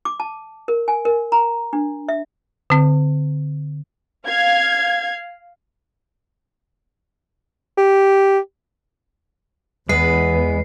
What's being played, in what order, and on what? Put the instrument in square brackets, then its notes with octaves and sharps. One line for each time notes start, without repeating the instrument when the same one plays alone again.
[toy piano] D6
A5
A#4
G#5
A#4
A#5
D4
E5
[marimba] D3 C4
[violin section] F5 G#6
[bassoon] G4
[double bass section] E2 [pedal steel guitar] G#3 B3 [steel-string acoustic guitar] B4 [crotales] C7